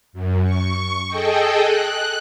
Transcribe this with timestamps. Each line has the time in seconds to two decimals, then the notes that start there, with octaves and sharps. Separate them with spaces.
0.13 F#2
0.43 C#6
1.07 G#4 A4 D#5 G5
1.60 F#6